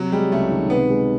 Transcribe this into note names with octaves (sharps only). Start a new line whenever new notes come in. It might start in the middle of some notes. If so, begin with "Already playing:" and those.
Already playing: C3 F#3
G3 G#3
C#2 A3
D#3
C3 B3
G#3